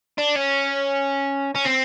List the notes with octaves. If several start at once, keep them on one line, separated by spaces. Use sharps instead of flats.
D4
C#4
C#4
C4